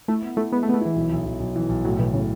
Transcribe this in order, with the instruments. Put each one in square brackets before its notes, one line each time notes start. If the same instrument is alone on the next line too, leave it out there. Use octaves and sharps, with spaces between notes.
[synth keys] A3 [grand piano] E4
[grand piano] B3
[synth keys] A3 [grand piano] E4
[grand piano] G#3 [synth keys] B3
[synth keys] A3
[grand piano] G#3 [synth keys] B3
[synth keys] A3
[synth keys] E3 [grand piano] E4
[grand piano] B1
B1
B1
B1
E3
B1
[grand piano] A2 [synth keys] F#3
[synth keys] B2 [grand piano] E3
[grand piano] A2 [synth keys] C#3